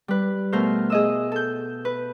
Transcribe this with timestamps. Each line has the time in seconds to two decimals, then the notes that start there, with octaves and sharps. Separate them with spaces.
0.08 G3 B4
0.52 B2 A3 A#4 C5 F6
0.90 G#4 D#5 E6
1.32 A4 G6
1.85 B4